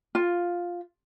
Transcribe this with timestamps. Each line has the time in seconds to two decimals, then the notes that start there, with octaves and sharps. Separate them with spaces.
0.15 F4